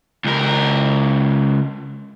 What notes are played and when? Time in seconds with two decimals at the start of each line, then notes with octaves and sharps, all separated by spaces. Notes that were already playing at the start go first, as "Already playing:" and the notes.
0.24 C#2 A#4